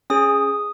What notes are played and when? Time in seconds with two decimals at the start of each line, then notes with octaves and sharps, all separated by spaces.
0.10 C#4 G#4 D#6